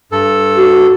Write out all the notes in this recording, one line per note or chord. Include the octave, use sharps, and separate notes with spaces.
G2 A4
F#4